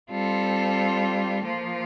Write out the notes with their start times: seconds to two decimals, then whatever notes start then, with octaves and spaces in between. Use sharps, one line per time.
0.11 G3 C4 F4 A4
1.45 F3 A#3 F4